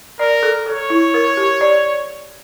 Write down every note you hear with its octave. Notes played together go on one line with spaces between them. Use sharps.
A#4 D5
A4
A4 C#5
E4
A#4
G4
D5